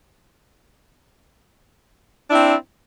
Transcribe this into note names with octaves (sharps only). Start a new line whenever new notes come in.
C4 D4 E4